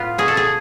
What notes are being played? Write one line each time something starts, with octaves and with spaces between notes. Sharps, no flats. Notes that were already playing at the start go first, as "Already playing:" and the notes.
Already playing: A2 B3 F4
B2 G#4
A4
G#4